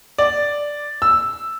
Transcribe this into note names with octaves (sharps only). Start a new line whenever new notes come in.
D5
E6